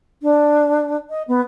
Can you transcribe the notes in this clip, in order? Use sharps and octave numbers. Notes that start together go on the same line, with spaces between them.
D4
D#5
B3